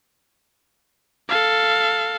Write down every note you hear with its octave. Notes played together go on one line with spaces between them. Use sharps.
A4 F5